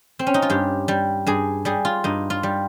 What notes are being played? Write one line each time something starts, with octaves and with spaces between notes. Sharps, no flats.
C4
C#4
D#4
F4
G2 G4
G3
G2 G#4
G3 G#4
F4
G2 D#4
F4
G3